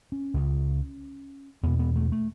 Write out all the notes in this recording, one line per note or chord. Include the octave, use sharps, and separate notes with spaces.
C#4
C#2 C#3
E2 B2 B3
B3
A3
A3